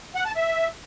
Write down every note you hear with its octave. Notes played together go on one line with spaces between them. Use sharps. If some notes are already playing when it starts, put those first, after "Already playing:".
F#5
A5
E5